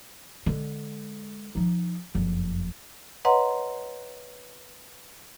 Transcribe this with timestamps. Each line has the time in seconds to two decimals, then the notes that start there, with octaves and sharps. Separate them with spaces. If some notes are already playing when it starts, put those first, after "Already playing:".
0.46 D3 G#3
1.55 F3 D#4
2.15 F#1 F2
3.25 B4 C#5 D#5 F#5 A#5 C6